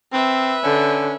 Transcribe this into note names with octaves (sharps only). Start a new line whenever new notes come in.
C4 B4 E5
D3 C#4